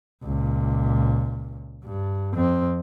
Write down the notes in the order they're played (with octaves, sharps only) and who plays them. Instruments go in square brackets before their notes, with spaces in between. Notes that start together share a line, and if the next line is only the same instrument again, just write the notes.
[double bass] C#2 A#2
G2
F2 C4